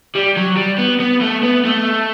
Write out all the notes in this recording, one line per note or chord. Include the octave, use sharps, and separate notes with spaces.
G3
F#3
G3
B3
B3
A3
B3
A3